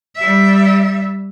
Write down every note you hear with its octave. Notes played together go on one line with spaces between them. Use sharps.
G3 E5